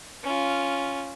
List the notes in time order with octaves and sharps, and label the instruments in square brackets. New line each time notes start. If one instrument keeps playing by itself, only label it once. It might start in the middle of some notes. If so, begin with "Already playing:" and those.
[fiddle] C#4 F4